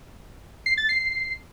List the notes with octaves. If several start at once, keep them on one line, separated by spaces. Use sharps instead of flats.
C7
A6
C7